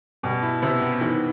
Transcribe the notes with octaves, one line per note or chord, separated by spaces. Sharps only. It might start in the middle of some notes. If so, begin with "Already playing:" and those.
B2 G3
E4
C3 B3
B3
D#3 E3